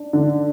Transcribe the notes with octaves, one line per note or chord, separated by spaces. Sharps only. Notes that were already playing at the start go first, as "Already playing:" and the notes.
Already playing: D4
D3